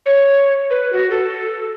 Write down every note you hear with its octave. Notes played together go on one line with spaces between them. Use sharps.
C#5
B4
F#4
A4